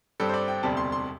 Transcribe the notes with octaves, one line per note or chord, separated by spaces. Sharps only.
G2 G3 C4 A4
C5
D5
G5
E1 D2 C3 G3 A5
C6
C6